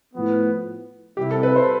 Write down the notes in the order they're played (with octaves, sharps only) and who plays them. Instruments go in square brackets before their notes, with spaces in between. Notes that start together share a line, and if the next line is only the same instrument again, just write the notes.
[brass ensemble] A2 F3 B3
[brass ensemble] C3 G3 C4 E4 [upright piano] G4
[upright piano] A4
B4
C5